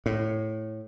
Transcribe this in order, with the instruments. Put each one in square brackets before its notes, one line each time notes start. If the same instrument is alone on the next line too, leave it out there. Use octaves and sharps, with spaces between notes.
[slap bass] A2